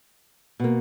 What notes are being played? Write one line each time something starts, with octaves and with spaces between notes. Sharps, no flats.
B2 A#3